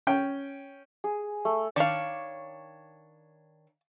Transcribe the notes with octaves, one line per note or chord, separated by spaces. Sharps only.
C#4 G5
G#4
A3
D#3 D4 C#5 D5 F5